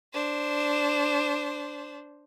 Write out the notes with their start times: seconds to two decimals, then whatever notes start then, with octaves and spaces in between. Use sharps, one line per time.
0.13 D4 C5